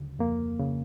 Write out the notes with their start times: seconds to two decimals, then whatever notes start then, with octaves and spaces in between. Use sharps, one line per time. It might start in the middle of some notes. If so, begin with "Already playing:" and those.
Already playing: D2 C#3
0.19 F2 A#3
0.59 C#3